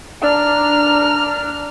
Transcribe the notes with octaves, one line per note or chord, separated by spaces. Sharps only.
D4 A#5 F6